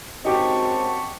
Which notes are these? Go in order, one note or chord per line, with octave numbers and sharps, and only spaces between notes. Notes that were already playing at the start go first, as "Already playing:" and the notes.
F#2 G#3 C4 D#4 F#4 G4 A5 C#6